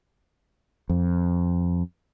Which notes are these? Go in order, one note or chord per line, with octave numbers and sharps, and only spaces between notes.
F2